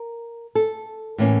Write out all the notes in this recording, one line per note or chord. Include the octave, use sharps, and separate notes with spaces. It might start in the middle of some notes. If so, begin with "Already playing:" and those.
Already playing: A#4
A4
A2 E3 A#3 C#4